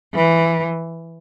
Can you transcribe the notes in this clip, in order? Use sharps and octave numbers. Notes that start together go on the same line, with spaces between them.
E3